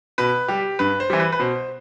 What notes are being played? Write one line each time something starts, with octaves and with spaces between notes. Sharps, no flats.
B2 B4
G3 G4
G2 B4
C5
E3 G3
B4
B4
B2 C5